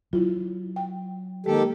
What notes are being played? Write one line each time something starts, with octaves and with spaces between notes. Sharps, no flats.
F#3 E4 F4
G5
D#3 G#3 A#3 G4 A4